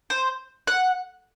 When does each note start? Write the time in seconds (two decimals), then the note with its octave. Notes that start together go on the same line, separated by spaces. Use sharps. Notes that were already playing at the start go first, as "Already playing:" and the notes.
0.10 C5
0.67 F#5